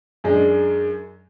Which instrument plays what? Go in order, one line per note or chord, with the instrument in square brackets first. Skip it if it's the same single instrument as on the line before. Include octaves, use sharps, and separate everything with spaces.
[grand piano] F#2 G#3 D4